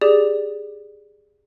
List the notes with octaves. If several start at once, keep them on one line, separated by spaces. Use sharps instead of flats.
G4 G#4 D5